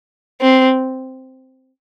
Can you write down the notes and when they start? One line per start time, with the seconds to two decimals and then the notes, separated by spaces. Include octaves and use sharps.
0.42 C4